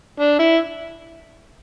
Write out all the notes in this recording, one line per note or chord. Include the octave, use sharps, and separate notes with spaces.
D4
E4